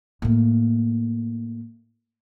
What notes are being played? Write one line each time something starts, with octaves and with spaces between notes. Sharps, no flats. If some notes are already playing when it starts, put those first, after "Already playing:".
A2 A#3